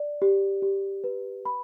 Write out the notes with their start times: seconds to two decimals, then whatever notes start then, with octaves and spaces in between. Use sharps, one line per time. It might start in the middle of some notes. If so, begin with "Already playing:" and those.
Already playing: D5
0.22 G4
0.62 G4
1.04 B4
1.45 B5